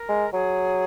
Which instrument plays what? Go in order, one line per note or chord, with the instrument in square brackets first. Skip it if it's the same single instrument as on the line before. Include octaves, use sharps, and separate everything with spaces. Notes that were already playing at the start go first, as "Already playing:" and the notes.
Already playing: [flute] A#4
[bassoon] G#3
[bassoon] F#3 [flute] G#4